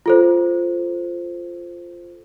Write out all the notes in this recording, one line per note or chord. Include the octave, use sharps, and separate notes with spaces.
F4 A4 C5